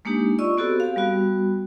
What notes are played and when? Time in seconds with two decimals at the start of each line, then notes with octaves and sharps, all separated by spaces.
0.05 G#3 A#3 D4 D#4 G4
0.39 F4 D5 D#5 C#6 E6
0.58 B3 C4 F#4 G4 A4 C5
0.80 G4 F5
0.96 G3 B3 F#4